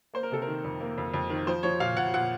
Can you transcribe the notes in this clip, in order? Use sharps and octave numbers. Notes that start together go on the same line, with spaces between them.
A#3 C5
A#4
C3 A4
A#4
D#3
F2
A#3
F2
F2
D#3
F3 C5
F3 C#5
A#2 F5
A#2 F#5
A#2 F#5